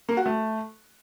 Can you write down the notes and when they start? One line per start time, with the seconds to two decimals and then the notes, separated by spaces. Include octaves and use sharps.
0.09 A#3
0.17 F#4
0.26 A3